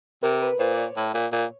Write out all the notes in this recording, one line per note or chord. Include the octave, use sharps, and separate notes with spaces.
C3 A#4
A#4
B4
A#2 C5
D5
C#5
A2
A#2
A#2